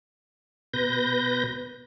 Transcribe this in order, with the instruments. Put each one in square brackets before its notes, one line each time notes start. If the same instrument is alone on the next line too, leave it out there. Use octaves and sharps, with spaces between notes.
[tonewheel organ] B2 B4 G6 A#6